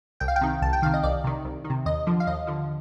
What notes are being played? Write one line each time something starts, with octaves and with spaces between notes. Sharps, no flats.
C2 G5
F5
G5
C3 D#3
C2 A5
G5
C3 D#3 F5
D#5
C2 D5
C3 D#3
C2
D#3
C3
D#2 D#5
D3 F3
F5
D#2 D#5
D3 F3